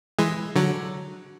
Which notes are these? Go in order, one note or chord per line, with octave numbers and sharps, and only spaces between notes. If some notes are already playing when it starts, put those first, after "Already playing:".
E3 G#3
D3 F#3